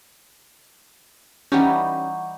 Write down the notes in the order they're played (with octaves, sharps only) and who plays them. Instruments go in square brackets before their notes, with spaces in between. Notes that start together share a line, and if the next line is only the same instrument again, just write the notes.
[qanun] E3 G3 D#4 [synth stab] C#4 G4 [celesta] F#5 C#6 G6